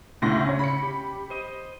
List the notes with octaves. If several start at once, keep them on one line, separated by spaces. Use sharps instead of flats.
D2 A2 C#3 A#6
C#4 C#5
B5 C#7
G4
C5 D#5